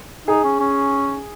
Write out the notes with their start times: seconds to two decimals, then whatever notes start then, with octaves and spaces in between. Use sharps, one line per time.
0.27 D#4 G#4
0.44 C#4
0.60 C#4